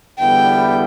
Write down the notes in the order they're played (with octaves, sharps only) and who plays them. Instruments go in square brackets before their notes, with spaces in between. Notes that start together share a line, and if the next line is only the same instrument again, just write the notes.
[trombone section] E2 D3 G3 B3 E4 [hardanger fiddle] G5